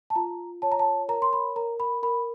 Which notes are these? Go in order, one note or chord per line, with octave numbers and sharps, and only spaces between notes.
A5
F4 A#5
C#5 A5
A#5
A5
A#4 A#5
C6
B5
A#4 A#5
B5
A#4 B5